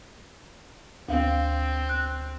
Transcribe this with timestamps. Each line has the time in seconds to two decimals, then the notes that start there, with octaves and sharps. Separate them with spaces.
1.09 D2 C4 F5
1.89 F#6